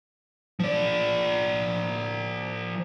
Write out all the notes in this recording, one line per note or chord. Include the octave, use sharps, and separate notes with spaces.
F3 D5